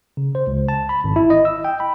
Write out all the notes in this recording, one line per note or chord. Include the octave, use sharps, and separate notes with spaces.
C#3
C5
C#2
A5
B5
G#1
E4
D#5
E6
G5
B5